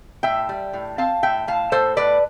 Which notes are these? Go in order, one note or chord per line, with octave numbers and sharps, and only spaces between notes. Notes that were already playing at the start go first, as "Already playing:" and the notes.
A2 E5 G5
G3
A2
C4 F5 A5
A2 E5 G5
A2 F5 A5
A2 A4 C5
A2 B4 D5